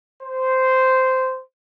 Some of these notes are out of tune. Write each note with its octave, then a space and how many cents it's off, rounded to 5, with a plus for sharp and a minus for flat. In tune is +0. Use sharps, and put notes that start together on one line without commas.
C5 -10